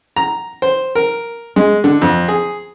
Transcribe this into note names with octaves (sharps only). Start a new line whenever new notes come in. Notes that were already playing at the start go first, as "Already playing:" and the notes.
A#5
C5
A#4
G#3
D3
F2
G#4